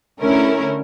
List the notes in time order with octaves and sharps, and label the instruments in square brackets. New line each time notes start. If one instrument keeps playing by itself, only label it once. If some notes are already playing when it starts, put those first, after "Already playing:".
[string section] D3 A3 C#4 E4 A#4